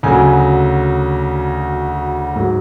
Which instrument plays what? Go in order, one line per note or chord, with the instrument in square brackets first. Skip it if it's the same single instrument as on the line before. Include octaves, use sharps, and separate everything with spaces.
[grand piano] D2 C#3 F#3 G#5
G#2 F#3